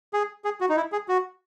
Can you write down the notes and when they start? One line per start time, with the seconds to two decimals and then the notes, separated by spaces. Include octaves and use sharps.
0.13 G#4
0.44 G#4
0.61 F#4
0.69 D#4
0.77 E4
0.92 G#4
1.08 F#4